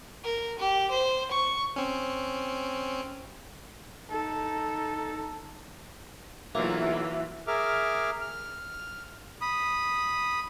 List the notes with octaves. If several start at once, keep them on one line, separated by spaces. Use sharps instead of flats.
A#4
G4
C5
C#6
C4 C#4
D#4 A4
B1 E3 F#3 A#3 F4 E5
G#4 A#4 E5 D6 F6
F6
B5 D#6